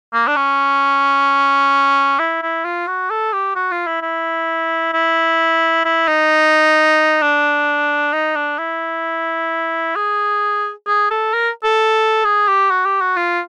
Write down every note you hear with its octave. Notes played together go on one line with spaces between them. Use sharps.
A#3
D4
C#4
E4
E4
F4
F#4
A4
G4
F#4
F4
E4
E4
E4
E4
D#4
D4
D#4
D4
E4
G#4
G#4
A4
A#4
A4
G#4
G4
F#4
G4
F#4
F4